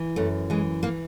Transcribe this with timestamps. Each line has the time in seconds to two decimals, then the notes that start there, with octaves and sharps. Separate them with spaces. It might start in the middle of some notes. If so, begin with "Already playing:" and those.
Already playing: E3
0.16 F#2 A3
0.50 E3 G#3
0.83 E3 A#3